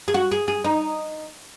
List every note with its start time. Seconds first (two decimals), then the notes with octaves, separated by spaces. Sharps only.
0.08 G#4
0.14 F#4
0.32 G#4
0.48 G#4
0.64 D#4